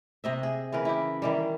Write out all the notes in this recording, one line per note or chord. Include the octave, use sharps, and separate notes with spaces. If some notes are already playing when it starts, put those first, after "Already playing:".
C3 D#5 E5
G#4
C#3 E3 A#4 B4
E4 G4
D#3 E3 G3